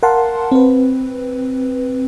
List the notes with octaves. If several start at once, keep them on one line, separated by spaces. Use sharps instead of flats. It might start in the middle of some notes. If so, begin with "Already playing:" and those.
A#4 F5 F#5 A5 C6
C4 B4